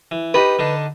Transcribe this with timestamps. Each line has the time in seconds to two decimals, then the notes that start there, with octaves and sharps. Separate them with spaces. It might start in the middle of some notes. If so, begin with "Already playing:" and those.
0.11 E3
0.34 D#4 G4 B4 D#6
0.59 D3 D4 D#4